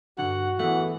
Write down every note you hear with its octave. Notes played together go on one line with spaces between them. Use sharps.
G2 D3 F#4 F#5
E2 G#2 E3 A3 F#5